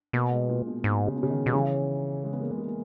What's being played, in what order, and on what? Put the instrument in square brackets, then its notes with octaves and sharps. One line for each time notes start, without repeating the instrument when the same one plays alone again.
[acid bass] B2 [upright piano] A#3
[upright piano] G#3
A#2
B2
[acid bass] G#2 [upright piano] B2
[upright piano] C#3
B2
C#3
D#3
[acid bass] B2 [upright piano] G3
[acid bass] C#3 [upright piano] E3
[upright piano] G#3
B3
A#3
G#3
A#3
A#3